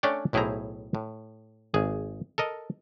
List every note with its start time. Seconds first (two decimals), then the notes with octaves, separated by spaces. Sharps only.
0.03 A3 C#4 D4 C#5 D5 G5
0.33 B1 A2 E4 G#4 C5 A#5
0.95 A2
1.74 G#1 G#4
2.38 A4 A#4 D#5